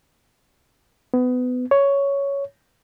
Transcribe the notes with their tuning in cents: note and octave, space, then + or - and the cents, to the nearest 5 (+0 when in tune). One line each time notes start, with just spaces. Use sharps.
B3 +25
C#5 +10